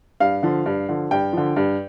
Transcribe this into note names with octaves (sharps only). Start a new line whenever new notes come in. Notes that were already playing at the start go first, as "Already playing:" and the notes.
G2 F5
D3 F3
G2
D3 F3
G2 G5
D3 F3
G2